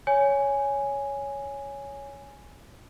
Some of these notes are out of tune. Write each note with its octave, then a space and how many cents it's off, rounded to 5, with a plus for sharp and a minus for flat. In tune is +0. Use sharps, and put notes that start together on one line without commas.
C#5 +10 G#5 +0